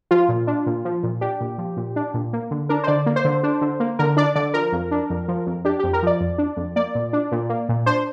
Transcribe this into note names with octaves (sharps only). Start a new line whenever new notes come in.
F3 F4
A#2
D4
A#2
F3
A#2
D4 G4
A#2
F3
A#2
D4
A#2
A#3
D3
D4 A#4
C5
D3 D5
A#3
C5
D3
D4
D3
A#3
D3 A#4
D4 D5
D3 D5
F3 A#4
F2
D4
F2
F3
F2
D4 G4
F2 G4
A#4
F3 D5
F2
D4
F2
A#3 D5
A#2
D4
A#2
A#3
A#2
D4 C5